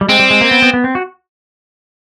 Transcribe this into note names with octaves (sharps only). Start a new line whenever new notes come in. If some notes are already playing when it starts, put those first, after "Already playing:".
G3
G#3 C4
G3
G#3
A#3
B3
B3
B3
C4
F#4